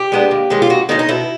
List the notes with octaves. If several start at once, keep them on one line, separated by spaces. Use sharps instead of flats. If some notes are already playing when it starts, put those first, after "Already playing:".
Already playing: G4
G#3 B3 D4
D#2
D#3 G#3 C#4
F4
D#2 F#4
D#3 G#3 C#4 D#4
D#4
B2 E4